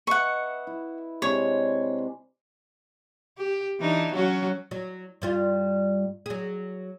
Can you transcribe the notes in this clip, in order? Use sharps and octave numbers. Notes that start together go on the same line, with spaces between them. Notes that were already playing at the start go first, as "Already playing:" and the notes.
B4 D#5 E5 F#5 C#6
E4
C3 G#3 D4 C#5
G4
E3 D4 D#4
F#3 C#4 F#4
F#3
G2 G3 F4
F#3 G#4